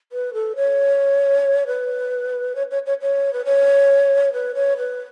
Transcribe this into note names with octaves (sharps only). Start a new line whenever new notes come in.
B4
A4
C#5
B4
C#5
C#5
C#5
C#5
B4
C#5
B4
C#5
B4